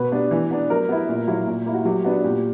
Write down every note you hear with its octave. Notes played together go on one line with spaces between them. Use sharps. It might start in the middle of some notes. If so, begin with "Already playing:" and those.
Already playing: B2 B4
G3 B3 D4
E3
B3 D4
F#3 A#4
B3 E4
A#2
F#3 A#3 E4
A#2
A#3 E4
F#4
F#3 G4
B3 D4 F#4
A#2 G4